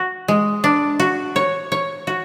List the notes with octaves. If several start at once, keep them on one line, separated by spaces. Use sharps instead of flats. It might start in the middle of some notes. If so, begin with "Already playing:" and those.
Already playing: F#4
G#3
D4
F#4
C#5
C#5
F#4